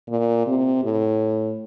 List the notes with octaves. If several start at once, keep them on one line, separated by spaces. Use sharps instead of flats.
A#2
C3
A2